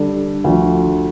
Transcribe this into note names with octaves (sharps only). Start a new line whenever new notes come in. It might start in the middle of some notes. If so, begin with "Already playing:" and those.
Already playing: D3 G3 D4 A4
D2 D3 F3